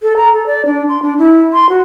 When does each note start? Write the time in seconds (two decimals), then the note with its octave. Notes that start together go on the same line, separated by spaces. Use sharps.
0.03 A4
0.16 A#5
0.33 A4
0.47 D5
0.66 D4
0.89 C6
1.02 D4
1.18 E4
1.53 C6
1.69 F#4